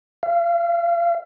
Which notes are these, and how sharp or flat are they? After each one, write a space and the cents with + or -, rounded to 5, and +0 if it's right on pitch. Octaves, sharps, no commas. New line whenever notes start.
F5 -35